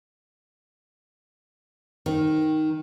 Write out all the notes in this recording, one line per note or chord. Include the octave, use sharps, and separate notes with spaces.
D#3